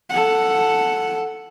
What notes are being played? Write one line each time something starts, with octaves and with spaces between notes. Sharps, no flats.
A4 F#5